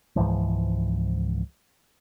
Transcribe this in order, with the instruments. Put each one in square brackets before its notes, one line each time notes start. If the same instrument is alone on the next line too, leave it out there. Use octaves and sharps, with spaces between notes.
[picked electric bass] C#2 G#2 E3 F3